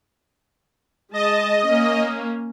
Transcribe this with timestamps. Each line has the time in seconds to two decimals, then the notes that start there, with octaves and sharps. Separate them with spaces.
1.13 G#3 D#5 A5
1.67 A#3 C#4